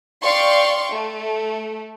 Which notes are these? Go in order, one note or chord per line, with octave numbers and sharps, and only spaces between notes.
D5 F5 G5 C6 C#6
A3